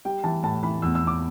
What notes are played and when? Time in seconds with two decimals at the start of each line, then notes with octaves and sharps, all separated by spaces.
0.05 G3 G5
0.24 E3 A5
0.43 A2 A5
0.63 E3 B5
0.82 E2 E6
0.95 E6
1.01 E2
1.07 D6